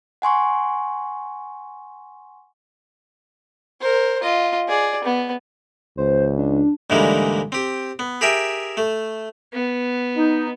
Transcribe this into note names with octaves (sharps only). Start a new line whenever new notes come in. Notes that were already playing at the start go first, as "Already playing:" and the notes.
F#5 G#5 C6 C#6
A#4 C5
F4 D#5
G#4 D5
B3
C#2 C5
D4
D2 G#2 E3 G3 G#3 A#3
C4 G4
B3
G4 G#4 A#4 E5 G5 G#5
A3
B3
D#4